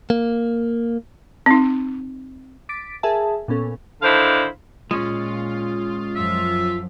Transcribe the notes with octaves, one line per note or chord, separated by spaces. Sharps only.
A#3
C4 D#4
D6 A6 B6 D7
G#4 A#4 E5 G#5 A5
A#2 B3 C#4 A4
D3 D#3 D4 E4 C5 F5
A#2 G#3 C#4 F4
F#2 F3 E5